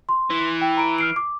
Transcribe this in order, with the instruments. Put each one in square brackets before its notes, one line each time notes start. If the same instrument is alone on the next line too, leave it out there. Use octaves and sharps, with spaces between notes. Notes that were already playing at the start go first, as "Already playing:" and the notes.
[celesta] C6
[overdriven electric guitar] E3
[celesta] G5
A#5 B5 D7
F6 C7 D7
D6